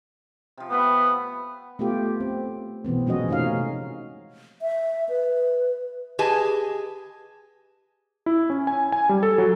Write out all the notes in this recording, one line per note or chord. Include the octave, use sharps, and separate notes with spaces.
C3 F3
A3 B3 B4 B5
A3 B3 F4 G4
C4
B2 E3 B3 C4
A#2 F3 G#3 C#4 F#4 D#5
C3 A3 C#4 D#4 F5
E5
B4
G4 G#4 B4 D#5 G#5 A5
E4
C#4
G#5
G#5
G3
A4
F#3